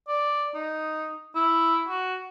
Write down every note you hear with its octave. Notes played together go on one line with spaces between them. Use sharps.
D5
D#4
E4
F#4